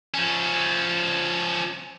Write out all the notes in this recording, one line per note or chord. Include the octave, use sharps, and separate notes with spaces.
F3 C#4